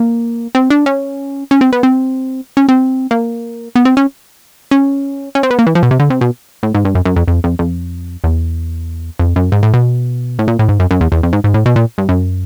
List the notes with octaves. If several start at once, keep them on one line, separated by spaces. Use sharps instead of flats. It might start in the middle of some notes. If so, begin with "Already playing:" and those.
Already playing: A#3
C4
D4
C#4
C#4
C4
B3
C4
C#4
C4
A#3
B3
C4
C#4
C#4
C#4
C4
B3
A#3
E3
F3
B2
C3
D3
C3
B2
A2
G#2
G2
F#2
F#2
F2
F2
F2
F2
E2
F2
F#2
G#2
A2
B2
A2
A#2
A2
G#2
F#2
F#2
E2
E2
F2
G#2
G#2
A2
B2
A#2
G2
F#2